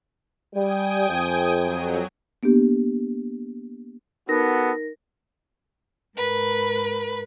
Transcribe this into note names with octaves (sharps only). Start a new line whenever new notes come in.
G3 G5 G#5 D#6
F2
F#3
A#3 B3 D4 G4
B3 D#4 F#4 A4 A#4 A#6
G#2 A#4 B4